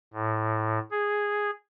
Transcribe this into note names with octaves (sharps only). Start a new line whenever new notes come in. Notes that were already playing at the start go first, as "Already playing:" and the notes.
A2
G#4